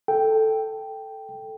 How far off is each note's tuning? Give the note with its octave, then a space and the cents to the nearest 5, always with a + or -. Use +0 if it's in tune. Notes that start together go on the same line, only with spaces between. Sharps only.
A4 +0 G5 +0